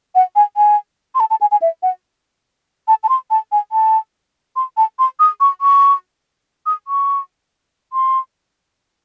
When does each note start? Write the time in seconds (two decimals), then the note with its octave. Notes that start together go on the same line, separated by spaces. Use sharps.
0.15 F#5
0.36 G#5
0.57 G#5
1.15 C6
1.20 A5
1.30 A5
1.41 G#5
1.51 G#5
1.62 E5
1.83 F#5
2.88 A5
3.04 A5
3.09 C6
3.30 A5
3.52 G#5
3.72 A5
4.56 C6
4.77 A5
4.99 C6
5.20 D#6
5.40 C#6
5.61 C#6
6.66 D#6
6.88 C#6
7.93 C6